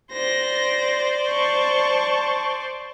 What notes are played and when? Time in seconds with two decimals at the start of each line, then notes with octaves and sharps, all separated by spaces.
0.12 C5 D5 A#6
1.30 A5 C#6